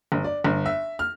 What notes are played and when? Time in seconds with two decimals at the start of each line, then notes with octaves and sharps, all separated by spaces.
0.12 G1
0.24 D5
0.44 G1
0.66 E5
0.99 F6